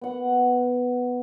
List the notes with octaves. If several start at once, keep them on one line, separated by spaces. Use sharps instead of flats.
B3 F#5